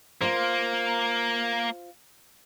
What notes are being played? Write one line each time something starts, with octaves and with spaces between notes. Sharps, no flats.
A#3 F4 C5